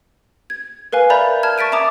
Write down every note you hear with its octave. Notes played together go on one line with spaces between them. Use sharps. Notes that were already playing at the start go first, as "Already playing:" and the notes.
G#6
A#4 B4 F5 G#5
A#4 D5 E5 A#5 B5 G6
A5 F6 G#6
C#6 A6 B6 D7 D#7
E5 A5 A#5 D6 D#6